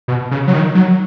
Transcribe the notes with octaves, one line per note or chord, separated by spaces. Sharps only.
B2
C#3
F#3
D#3
F#3